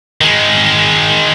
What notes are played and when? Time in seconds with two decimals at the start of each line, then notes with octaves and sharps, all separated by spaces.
0.21 D#3 G#3